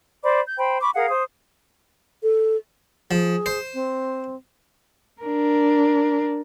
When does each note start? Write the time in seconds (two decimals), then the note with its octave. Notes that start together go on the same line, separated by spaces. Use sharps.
0.23 C5 D5 B5 D6
0.46 G6
0.58 C5 G5 B5
0.81 B5 C#6 D6
0.95 G#4 A#4 F5 F#5
1.10 C5 D#6
2.23 A4
3.11 F3 G#4
3.46 C5
3.74 C4
5.22 D4 A#4